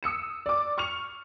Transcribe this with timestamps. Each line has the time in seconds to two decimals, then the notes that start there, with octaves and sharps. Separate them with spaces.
0.03 D#6 E6 C#7 E7
0.46 D5 D6
0.78 C#6 F6 C#7 F7